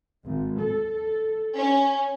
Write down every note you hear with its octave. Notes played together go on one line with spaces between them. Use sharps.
G#1
A4
C#4